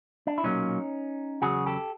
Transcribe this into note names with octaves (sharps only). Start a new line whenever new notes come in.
D4
E4
B1 A#2 F#3 A#3 C#4 D#4
E2 C#3 F#3 F#4 G#4
G4 A4